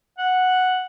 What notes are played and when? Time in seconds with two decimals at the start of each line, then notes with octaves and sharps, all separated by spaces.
0.18 F#5